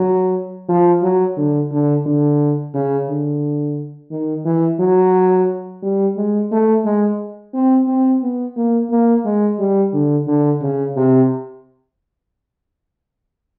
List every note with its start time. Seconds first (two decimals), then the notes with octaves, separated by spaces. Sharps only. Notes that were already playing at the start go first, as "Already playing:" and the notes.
Already playing: F#3
0.68 F3
1.02 F#3
1.37 D3
1.71 D3
2.06 D3
2.74 C#3
3.09 D3
4.11 D#3
4.45 E3
4.80 F#3
5.83 G3
6.17 G#3
6.51 A3
6.85 G#3
7.54 C4
7.88 C4
8.22 B3
8.56 A#3
8.90 A#3
9.25 G#3
9.59 G3
9.93 D3
10.27 D3
10.61 C#3
10.96 C3